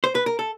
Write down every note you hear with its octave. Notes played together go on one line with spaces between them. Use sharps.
C5
B4
A#4
A4